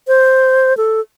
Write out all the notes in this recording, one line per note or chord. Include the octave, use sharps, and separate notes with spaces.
C5
A4